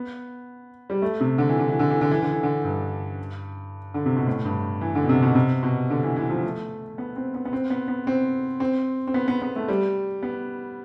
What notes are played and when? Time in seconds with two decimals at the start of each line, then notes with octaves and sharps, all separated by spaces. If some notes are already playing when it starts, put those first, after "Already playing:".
Already playing: B3
0.90 G3
1.02 A3
1.20 C3
1.38 D3
1.49 E3
1.59 D3
1.69 E3
1.79 D3
1.90 E3
2.01 D3
2.11 E3
2.22 D3
2.33 E3
2.43 D3
2.64 G2
3.94 D3
4.06 C3
4.16 B2
4.27 A2
4.45 G2
4.81 E3
4.95 D3
5.03 B2
5.09 C3
5.23 B2
5.35 C3
5.63 B2
5.90 D3
6.03 E3
6.16 E3
6.30 F3
6.43 A3
6.98 B3
7.16 C4
7.34 B3
7.45 B3
7.53 C4
7.70 B3
7.88 B3
8.07 C4
8.60 C4
9.07 C4
9.14 B3
9.28 B3
9.42 B3
9.56 A3
9.68 G3
10.23 B3